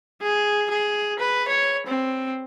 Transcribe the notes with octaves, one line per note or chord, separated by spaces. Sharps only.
G#4
G#4
B4
C#5
C4